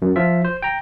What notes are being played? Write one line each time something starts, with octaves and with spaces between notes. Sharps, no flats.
F#2
F3 F4 E5
C5
G5 A#5